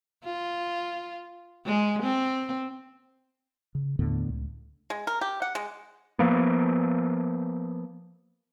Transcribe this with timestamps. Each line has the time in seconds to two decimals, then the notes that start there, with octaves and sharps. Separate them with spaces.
0.24 F4
1.66 G#3
2.02 C4
3.75 C#3
3.99 D#2 A2 D3 B3
4.29 C#2
4.90 G#3
5.07 A#4
5.21 G4
5.42 F#5
5.55 G#3
6.19 F3 A#3 B3